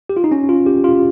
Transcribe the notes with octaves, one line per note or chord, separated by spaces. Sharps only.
G4
F4
D#4
C#4
F4
G4
F4